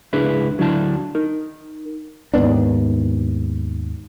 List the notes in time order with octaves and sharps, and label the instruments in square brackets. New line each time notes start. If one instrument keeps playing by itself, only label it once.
[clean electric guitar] C#2 D4 E4 G#4 B4 E5
D2 F#3 D4 E4 A5
D#4 A#4
[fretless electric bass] D#2 G#2 B3 D4